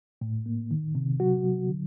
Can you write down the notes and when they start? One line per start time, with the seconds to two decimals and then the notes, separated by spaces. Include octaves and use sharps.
0.21 A2
0.46 A#3
0.71 D#3
0.95 C3
1.20 F#3 F#4
1.45 F#3
1.69 D3